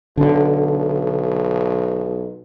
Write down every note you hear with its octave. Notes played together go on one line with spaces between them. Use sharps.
B1 D3